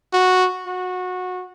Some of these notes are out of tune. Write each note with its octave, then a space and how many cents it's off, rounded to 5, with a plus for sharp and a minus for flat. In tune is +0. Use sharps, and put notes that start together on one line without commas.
F#4 -5
F#4 -20